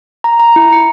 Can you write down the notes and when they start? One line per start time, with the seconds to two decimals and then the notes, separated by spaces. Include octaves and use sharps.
0.24 A#5
0.40 A#5
0.56 E4
0.73 C#7